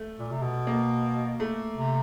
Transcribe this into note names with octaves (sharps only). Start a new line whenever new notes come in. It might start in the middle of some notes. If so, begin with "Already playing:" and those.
Already playing: A3
A#2
C3
B2
A#3
A3
C3